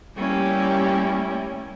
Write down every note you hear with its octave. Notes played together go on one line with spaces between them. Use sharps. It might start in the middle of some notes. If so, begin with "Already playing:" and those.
G3 A3 A#3 C#4 E4 G4